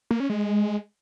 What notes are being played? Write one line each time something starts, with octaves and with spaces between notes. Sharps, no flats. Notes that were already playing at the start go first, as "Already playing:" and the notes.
A#3
C#4
G#3